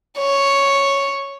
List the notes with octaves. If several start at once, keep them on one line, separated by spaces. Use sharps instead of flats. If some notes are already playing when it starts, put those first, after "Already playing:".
C#5